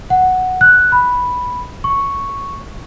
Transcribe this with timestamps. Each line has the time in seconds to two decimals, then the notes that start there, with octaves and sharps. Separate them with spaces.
0.10 F#5
0.61 F#6
0.92 B5
1.84 C#6